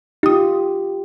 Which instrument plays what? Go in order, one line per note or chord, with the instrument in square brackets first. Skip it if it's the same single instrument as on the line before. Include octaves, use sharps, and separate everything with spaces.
[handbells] D#4 D#6 [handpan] F4 G4